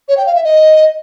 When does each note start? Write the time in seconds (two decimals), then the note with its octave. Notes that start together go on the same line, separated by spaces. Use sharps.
0.08 C#5
0.17 G5
0.26 F5
0.35 E5
0.44 D#5